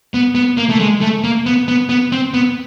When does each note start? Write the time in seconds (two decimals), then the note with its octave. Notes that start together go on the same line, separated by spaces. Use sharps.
0.14 B3
0.35 B3
0.57 A#3
0.70 A3
0.80 G#3
1.01 A3
1.24 A#3
1.46 B3
1.68 B3
1.89 B3
2.12 C4
2.34 B3